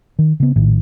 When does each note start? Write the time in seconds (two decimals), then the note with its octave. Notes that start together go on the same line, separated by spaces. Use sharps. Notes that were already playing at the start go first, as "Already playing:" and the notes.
0.19 D#3
0.40 C#3 B3
0.56 A#1 A2 D#3